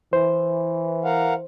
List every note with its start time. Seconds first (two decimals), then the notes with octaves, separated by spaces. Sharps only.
0.13 E3 C5
1.05 A#4 F5 F#5